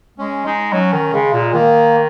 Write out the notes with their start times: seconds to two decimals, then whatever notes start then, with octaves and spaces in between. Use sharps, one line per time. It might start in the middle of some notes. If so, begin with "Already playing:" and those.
0.18 G#3 C#4
0.46 G#3 D#4
0.73 F#3 C#4
0.93 D#3
1.13 C#3 G#3
1.33 A#2
1.54 D#3 A#3